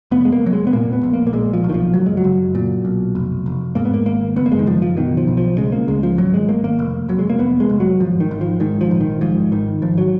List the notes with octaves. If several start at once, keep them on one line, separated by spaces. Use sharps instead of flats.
F1 B3
G#3
A#3
F1 F#3
G#3
B3
A#2 A#3
B3
A#1
A#3
A#3
A#2 G#3
F3
B1
D#3
F3
F#1 F#3
G#3
F#3
F#1
A#2
B1
F1
F1
G#2 A#3
B3
A#3
G#1 A#3
F#1 B3
A#3
G#3
D#3
F#1 F3
F3
B2 D#3
F3
B1
F3
C#3 G#3
A#3
C#2 G#3
F3
G#1 F#3
G#3
G#1 A#3
A#3
F1
F1 F#3
G#3
A#3
F1 B3
G#3
F1
F#3
G#1 F3
D#3
G#1
F3
G#2 D#3
F3
A#1
D#3
G#2 F3
G#1 D#3
G#1 F3
F#3